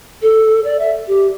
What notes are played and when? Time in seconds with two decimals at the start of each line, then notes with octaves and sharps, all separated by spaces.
0.22 A4
0.64 D5
0.79 E5
1.07 G4